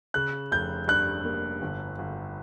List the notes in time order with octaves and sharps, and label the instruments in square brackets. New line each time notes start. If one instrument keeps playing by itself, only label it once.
[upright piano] C#3 [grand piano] F#6
[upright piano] F1 [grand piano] G6
[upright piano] G2 [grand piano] F#6
[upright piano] A#3
G1
G1